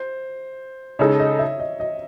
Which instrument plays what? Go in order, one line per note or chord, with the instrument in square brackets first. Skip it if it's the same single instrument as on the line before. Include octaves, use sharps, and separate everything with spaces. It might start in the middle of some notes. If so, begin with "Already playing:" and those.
Already playing: [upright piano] C5
[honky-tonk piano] C#3 G#3 D#4 A4 [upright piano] C#5
[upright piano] D#5
E5
D#5
D#5